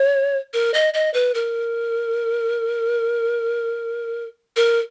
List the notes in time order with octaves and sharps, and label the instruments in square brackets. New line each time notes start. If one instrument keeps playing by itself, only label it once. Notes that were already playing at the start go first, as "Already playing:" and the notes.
Already playing: [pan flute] C#5
A#4
D#5
D#5
B4
A#4
A#4